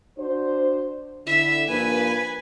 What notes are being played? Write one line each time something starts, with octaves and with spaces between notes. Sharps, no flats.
D4 F#4 C5
D3 E4 E5
G2 F3 A#3 B4 G#5